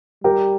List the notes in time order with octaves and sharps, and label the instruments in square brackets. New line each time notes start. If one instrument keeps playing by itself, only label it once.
[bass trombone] G3 [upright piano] G4 A#4